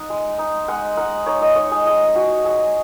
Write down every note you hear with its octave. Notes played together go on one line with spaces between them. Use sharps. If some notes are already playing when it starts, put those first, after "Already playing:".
Already playing: D#4 F#5
G#3
D#4
G#3 F#5
D#4 F#5
D#4 C#5
D#5
D#4 C#5
G#4
G#3 G#4
D#4 F#4
G#3 G#4